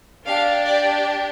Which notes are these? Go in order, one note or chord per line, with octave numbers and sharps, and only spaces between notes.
D4 G4 F5
D5